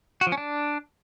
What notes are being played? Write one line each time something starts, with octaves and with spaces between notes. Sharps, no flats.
F#4
F3
C#4
D4